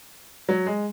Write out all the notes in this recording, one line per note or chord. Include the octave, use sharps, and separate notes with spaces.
F#3
G#3